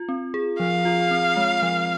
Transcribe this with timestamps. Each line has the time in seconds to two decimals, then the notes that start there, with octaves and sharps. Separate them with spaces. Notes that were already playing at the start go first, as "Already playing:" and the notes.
Already playing: F4
0.09 C4
0.34 G#4
0.60 F3 F5
0.85 F4
1.11 C4
1.37 G#3
1.63 F3